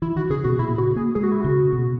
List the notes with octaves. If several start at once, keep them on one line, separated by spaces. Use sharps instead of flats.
E3 E4
D#3 F#4
C#3 G#4
B2 F#4
A#2 E4
C#3 F#4
A#3 G#4
G#3 G#4
F#4
E4
C#3 F#4
B2